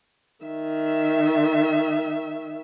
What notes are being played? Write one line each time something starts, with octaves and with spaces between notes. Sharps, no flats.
D#3 E5